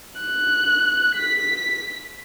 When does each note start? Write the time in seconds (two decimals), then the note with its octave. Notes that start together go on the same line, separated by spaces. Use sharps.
0.21 F#6
1.16 B6